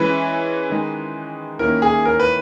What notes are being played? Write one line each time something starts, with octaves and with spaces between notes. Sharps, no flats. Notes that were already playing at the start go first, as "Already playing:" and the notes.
Already playing: E3 G#3 C#4 E4 B4
D#3 G#3 D#4
D#3 A#3 C#4 E4 A#4
G#4
A#4
B4